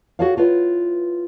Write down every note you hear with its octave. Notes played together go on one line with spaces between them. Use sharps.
F#4 G#4 A4 C#5 F5
E4 F4 B4 C#5